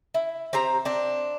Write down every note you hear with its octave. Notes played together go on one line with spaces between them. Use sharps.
E4
C4 G4 C5 A#5
C4 D4